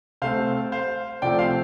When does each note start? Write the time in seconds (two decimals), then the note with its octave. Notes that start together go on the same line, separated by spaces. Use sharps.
0.22 C3 A3 C4 C5 F5
0.72 C5 F5
1.22 C3 F3 A3 C4 D5 G5
1.39 C5 F5